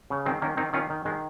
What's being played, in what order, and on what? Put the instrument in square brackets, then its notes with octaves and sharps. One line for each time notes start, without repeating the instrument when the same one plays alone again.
[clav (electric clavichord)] C#3
D#3 G#3 C4
D#3 A#3 C#4
D#3 C4 D#4
D#3 C#4 F4
D#3
D#3 G#3